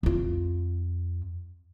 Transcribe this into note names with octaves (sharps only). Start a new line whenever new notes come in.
F2 F4